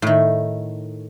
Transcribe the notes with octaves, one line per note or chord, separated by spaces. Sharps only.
A2 D#3